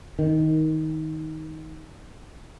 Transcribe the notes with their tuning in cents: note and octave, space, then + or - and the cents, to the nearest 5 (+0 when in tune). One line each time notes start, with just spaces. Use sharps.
D#3 +15